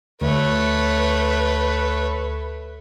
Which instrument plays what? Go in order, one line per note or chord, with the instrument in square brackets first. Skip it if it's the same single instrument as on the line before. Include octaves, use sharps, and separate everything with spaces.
[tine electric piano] D2 [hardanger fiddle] A3 C#5 [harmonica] B4